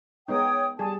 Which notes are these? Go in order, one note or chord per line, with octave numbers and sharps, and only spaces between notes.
G#3 B3 D#4 C#5 G5 D#6
G3 G#4 A5